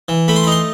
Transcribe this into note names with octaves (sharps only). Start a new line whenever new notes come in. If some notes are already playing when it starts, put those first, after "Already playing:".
E3
A3 B5
C6
B5
D#4 C6